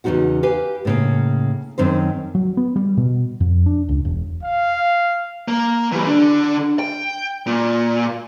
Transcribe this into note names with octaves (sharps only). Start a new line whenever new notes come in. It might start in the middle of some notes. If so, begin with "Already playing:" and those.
E2 C#3 E3 D#4 F#4 F#5
G4 B4 F5 G#5
A2 C#3 A#3
F#2 D#3 C4 C5
F#3
B3
G3
B2
F2
D4
C#2
E1
F5
A#3
E3 G3
D3 D4
G5
A#2